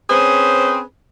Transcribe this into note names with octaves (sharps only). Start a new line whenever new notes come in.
C4 C#4 G#4 B4 C5